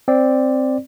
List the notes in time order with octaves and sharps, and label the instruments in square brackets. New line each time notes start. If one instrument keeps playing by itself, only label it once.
[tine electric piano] C4 D5